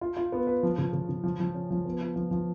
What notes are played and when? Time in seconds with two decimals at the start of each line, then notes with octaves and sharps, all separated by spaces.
0.01 F4
0.17 F4
0.32 B3
0.47 B4
0.63 F3
0.78 C#3
0.93 C#3
1.09 C#3
1.24 F3
1.40 F3
1.54 C#4
1.71 F3
1.86 B3
2.01 F4
2.16 F3
2.31 F3